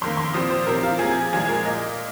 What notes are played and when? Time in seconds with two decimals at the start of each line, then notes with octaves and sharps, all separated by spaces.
0.01 F2 D#3 A#3 C6
0.17 C6
0.34 A#2 F3 C4 D#6
0.50 C5
0.67 C3 F3 C4 A#4
0.83 F4
0.99 C3 F3 A#3 G#4
1.33 A#2 F3 G#3 G#4
1.48 A#4
1.65 A#2 A#3 D#5